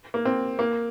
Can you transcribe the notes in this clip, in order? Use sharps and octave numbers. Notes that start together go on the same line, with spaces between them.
A#3
C4
A#3